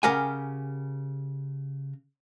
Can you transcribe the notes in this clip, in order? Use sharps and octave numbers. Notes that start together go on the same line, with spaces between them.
C#3 G4 A#4 F#5 G#5